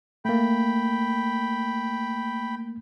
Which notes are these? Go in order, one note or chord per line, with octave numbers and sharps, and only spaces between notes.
A3 A#3 G5 B5